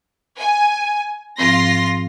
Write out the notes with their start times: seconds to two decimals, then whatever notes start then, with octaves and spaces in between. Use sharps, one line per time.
0.39 G#5
1.38 G#2 F3 C4 F4 C6 A#6